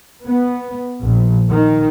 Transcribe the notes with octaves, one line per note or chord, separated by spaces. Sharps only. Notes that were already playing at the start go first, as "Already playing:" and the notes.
B3
A#1
D#3